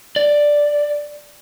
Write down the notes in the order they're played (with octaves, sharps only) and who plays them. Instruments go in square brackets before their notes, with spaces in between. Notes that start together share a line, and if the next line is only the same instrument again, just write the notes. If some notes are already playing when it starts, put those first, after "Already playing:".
[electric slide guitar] D5